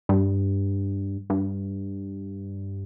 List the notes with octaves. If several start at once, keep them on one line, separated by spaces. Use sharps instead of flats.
G2
G2